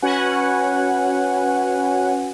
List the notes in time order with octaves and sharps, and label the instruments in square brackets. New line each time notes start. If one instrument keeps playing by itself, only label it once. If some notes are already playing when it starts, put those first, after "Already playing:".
[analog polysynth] C#4 F#4 B4 F#5 G#5